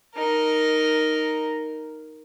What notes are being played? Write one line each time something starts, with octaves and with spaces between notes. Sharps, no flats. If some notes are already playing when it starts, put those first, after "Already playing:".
D#4 A#4